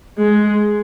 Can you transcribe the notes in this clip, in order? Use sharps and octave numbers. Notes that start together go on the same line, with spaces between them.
G#3